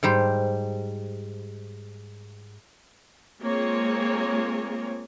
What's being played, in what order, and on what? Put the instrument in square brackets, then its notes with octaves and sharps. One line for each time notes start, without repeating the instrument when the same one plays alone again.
[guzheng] G#2 G3 C5
[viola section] G#3 A#3 C4 F4 G#4 C#5